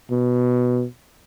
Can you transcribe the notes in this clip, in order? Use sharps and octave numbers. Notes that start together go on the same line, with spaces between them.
B2